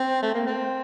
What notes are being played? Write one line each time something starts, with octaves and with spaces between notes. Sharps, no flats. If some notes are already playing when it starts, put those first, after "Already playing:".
Already playing: C4
A3
A#3
C4